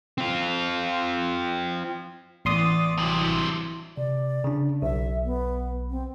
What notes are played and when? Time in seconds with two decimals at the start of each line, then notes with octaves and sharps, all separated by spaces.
0.18 C4 F4
2.45 A1 E3 B3 D5 C6 D#6
2.98 G2 C3 E3 F#3 E4
3.97 C3 D5
4.44 C#3 D4
4.82 B1 E5
5.24 B3
5.90 C4